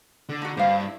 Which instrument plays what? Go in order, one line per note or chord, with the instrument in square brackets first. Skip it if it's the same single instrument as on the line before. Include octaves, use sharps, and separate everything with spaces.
[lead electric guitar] D3
[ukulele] D#4 F#4
[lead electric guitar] G2 [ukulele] C5 F5
[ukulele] E4